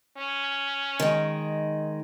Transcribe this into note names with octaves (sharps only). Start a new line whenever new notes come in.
C#4
D#3 G#3